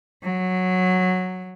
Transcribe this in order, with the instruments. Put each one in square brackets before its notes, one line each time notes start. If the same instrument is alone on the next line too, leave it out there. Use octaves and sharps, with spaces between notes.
[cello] F#3